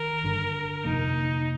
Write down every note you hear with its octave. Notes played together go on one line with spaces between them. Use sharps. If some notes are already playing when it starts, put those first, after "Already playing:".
Already playing: D#3 A#4
G1 G2 D3
F2 C3 F3 A#3 D#4